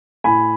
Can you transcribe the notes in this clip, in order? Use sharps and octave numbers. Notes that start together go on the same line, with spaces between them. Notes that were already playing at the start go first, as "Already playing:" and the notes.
A2 G#5 B5